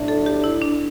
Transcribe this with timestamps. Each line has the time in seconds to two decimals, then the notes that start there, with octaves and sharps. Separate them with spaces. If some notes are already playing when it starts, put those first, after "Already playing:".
Already playing: B1 A2 A3 D4
0.08 A4
0.26 G4
0.44 E4
0.62 D4